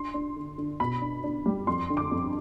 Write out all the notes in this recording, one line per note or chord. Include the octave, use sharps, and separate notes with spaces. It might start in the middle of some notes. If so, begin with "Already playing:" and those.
Already playing: D4 C6
D4
D3
D3
B2 B5
D4
D4
G3
F2 C6
D3
D6
F2